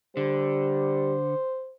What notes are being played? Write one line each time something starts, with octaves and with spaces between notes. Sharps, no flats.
D3 G3 C5